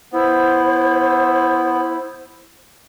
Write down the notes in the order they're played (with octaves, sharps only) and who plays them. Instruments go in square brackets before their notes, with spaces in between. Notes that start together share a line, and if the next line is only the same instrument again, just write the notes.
[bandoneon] B3 [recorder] E4 [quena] C5